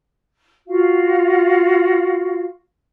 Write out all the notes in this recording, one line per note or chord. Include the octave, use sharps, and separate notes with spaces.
F4 F#4 F5